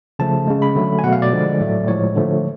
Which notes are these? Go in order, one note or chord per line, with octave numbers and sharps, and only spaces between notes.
C#3 F3 A3 A5
C#3 G#3
B5
D3 F#3 A3
G#5
B2 F#3 A3 F#5
F5
D5
D3 F3 G#3
A2 F#3 A3
A2 F3 G#3 C#5
D3 F3 A3